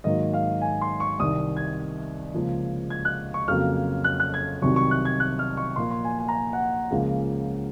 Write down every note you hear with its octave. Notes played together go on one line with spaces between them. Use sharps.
G#2 D#3 F#3 A#3 D#5
F5
G#5
C6
C#6
C2 C3 D#3 D#6
G#6
C#2 C#3 F3 A#3
G#6
F#6
C#6
F2 C#3 F#3 A#3 F6
F#6
F#6
G#6
C2 C3 D#3 F#3 C#6
C#6
F#6
G#6
F#6
F6
C#6
A#2 F3 A#3 C6
C6
G#5
G#5
A#5
G#5
F#5
C#2 C#3 F3 A#3